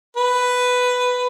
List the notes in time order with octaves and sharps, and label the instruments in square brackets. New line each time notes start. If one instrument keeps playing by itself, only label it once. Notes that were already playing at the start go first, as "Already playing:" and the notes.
[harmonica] B4